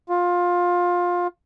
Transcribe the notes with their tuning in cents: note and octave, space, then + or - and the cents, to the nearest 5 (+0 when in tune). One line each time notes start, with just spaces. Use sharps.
F4 +20